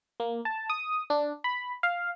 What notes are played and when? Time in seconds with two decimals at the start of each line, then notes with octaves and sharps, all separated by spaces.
0.20 A#3
0.45 A5
0.70 D#6
1.10 D4
1.44 B5
1.83 F5